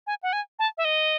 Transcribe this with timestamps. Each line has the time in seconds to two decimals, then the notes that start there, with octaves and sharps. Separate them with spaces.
0.07 G#5
0.23 F#5
0.33 G#5
0.59 A5
0.78 E5
0.85 D#5